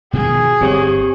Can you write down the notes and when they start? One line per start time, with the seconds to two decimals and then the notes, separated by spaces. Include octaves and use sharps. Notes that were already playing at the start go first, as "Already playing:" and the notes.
0.13 B2 D#3 F3 G#4
0.61 G1 C#3 G3 C4 G4 C#5